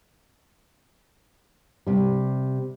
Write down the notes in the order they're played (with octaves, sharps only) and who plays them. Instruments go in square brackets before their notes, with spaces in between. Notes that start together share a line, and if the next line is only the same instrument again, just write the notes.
[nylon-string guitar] C3 G3